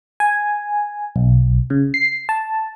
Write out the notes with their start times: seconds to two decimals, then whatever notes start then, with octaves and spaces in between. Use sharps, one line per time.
0.20 G#5
1.16 B1
1.70 C#3
1.94 C7
2.29 A5